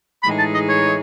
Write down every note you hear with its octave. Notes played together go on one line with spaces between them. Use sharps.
A2 E3 G#3 D#4 G#4 B5
A5
D#5
C#5